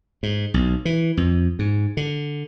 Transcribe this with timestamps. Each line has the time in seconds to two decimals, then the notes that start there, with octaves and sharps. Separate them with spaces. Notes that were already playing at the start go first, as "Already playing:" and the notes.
0.23 G#2
0.54 B1
0.85 E3
1.17 F2
1.59 G#2
1.97 D3